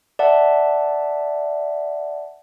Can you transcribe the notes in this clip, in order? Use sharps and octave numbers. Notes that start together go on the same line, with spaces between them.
D5 E5 F#5 A5